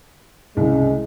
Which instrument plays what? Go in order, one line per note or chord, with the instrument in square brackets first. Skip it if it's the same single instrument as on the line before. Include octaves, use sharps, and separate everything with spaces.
[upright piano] C2 C#3 [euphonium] G#3